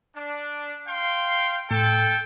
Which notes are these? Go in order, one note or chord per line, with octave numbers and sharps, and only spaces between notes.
D4
F5 G5 C6
A2 A4 G5